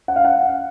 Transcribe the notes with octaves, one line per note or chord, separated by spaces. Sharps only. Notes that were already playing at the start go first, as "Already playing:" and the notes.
F#5
F5
F#5